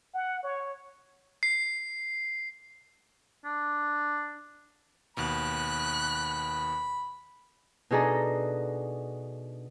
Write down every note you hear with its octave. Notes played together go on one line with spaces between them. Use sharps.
F#5
C#5
C7
D4
D#2 B2 B5 F#6
B2 D4 D#4 G#4 A4 A#5